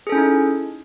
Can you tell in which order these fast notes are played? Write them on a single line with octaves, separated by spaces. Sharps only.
G#4 A4 C#4 E4 D#4